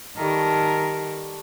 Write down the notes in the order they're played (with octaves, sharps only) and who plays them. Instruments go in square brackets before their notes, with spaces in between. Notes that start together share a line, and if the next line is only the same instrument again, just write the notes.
[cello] D#3 A#4 [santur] G3 A3 A5